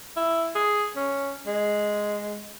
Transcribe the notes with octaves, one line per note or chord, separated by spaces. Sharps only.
E4
G#4
C#4
G#3